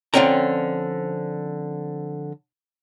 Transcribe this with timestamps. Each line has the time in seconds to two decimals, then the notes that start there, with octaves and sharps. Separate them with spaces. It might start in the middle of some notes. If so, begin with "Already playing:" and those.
0.14 D3 F3 C4 C#4 G5 A#5